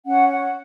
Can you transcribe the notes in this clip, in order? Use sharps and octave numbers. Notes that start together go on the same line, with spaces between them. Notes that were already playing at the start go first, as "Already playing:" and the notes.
C#4 F#5
F#5